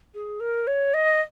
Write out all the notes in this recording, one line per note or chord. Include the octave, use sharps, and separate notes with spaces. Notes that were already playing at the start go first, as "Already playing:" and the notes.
G#4
A#4
C#5
D#5